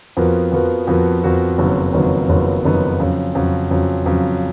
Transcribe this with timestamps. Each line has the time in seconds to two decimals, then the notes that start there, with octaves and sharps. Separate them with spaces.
0.17 F2 F3 B3 F#4 A#4
0.52 F2 F3 B3 F#4 A#4
0.87 F2 F3 B3 F#4 A#4
1.23 F2 F3 B3 F#4 A#4
1.58 F#1 F2 D#3 F#3 B3
1.93 F#1 F2 D#3 F#3 B3
2.29 F#1 F2 D#3 F#3 B3
2.65 F#1 F2 D#3 F#3 B3
3.00 F2 C#3 F#3
3.35 F2 C#3 F#3
3.71 F2 C#3 F#3
4.06 F2 C#3 F#3